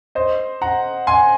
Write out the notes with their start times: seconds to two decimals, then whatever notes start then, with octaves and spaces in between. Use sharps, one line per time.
0.15 C5 D#5
0.62 F#5 A#5
1.07 G#5 C6